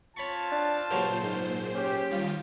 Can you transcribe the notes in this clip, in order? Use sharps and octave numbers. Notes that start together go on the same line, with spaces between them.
C4 F4 C#5 A5 B5 C#6 A6
D4
G2 A#2 C#3 F#3 C5
G#2
C#4 G4
D#3 G3 F4